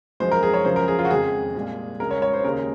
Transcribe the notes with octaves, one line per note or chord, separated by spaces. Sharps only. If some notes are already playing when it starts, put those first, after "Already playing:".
F#2 F3 G#3 C5
A#4
G#4
C#5
F#2 C#3 F3 C5
A#4
G#4
F4
F#4
F2 C#3 G#3 G#4
C2 A#2 G#3
C#2 C#3 G#3 A#4
C#5
C#5
C5
D#2 C#3 G#3 A#4